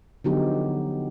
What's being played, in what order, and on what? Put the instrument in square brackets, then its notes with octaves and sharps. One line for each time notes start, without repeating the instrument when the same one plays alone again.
[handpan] D3 F3 F#3 B3 D#4 G4